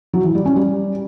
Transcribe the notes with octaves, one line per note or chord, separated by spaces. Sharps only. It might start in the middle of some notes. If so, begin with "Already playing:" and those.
F#3
E3
G3
C#4
G3